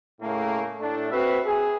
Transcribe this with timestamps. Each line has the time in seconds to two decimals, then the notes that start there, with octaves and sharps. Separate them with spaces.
0.21 A2 C#3 A3 A#3
0.80 A2 A3 D4
1.11 C4 F#4 B4 E5 F5
1.46 G#4